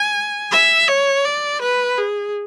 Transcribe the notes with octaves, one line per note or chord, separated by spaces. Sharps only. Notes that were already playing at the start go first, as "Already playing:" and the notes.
Already playing: G#5
E5
C#5
D5
B4
G#4